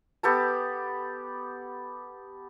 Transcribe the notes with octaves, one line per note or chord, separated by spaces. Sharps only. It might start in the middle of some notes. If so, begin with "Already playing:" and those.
B3 G4 A4 A5